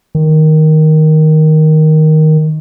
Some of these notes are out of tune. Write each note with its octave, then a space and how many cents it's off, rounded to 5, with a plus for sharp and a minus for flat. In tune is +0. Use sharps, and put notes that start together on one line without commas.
D#3 +5